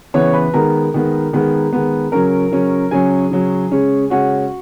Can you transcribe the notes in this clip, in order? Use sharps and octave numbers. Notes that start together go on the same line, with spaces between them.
C#3 E3 B3 C#5 C#6
B4 B5
D#3 G#3 B3 A#4 A#5
D#3 G#3 B3
D#3 G#3 B3
D#3 G#3 B3
C#3 F#3 C#4 A#4 A#5
C#3 F#3 C#4
C#3 F#3 C#4 G#4 G#5
C#3 F#3 C#4
C#3 G#3 C#4
C#3 G#3 C#4 F#4 F#5